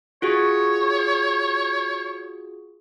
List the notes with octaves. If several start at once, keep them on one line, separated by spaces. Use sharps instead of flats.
F4 F#4 G#4 C#5